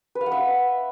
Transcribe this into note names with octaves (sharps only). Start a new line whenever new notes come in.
B4
F5
F#5
E5